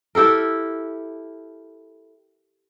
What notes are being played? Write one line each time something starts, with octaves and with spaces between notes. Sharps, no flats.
E4 G4 A4 A#4